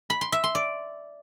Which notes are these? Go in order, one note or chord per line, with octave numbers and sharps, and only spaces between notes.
B5
C6
E5
C6
D5